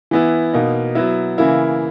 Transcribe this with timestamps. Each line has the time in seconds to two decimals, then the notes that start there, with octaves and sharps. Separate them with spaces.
0.11 E3 B3 E4
0.53 B2 A#3 D#4
0.95 F#3 B3 E4
1.38 C#3 E3 A#3 E4